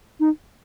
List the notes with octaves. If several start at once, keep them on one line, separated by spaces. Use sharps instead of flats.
D#4